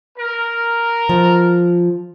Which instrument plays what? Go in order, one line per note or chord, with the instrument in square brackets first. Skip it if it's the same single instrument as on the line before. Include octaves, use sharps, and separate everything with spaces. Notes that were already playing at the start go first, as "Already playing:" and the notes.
[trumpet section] A#4
[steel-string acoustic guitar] F3